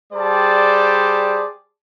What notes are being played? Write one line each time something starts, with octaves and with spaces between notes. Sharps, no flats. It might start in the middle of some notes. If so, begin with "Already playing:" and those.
G3 G#4 C5 D5 G5 A5